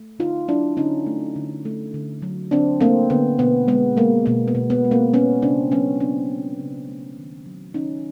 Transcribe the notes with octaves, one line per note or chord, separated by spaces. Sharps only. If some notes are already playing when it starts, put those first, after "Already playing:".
Already playing: A3
D3 D#4 F4
F#3 D4 E4
D3 C#4 D#4
A3
D3
A3
D3
F#3
D3 C4 D4
A3 A#3 C4
D3 B3
B2 B3
G#3 B3
G#3 A#3
B2 A#3
B3
B2
B3
G#3
A#3 C4
A#3 B3 C#4
C#3 C4 D4
F#3 B3 C#4
C#3 C4 D4
A#3
C#3
A3
D#3
F#3
D#3 C#4 D#4